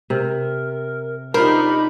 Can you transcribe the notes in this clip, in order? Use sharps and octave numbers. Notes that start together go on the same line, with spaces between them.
C3 A#4
D4 D#4 F4 G4 A#4 C5 B5